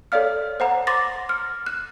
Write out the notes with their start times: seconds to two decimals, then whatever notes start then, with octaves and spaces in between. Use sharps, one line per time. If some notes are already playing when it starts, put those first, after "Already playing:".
0.12 A4 C#5 D5 F5 F6
0.60 C5 F#5 A#5
0.87 C6 D6 A6 A#6
1.29 F6
1.66 F#6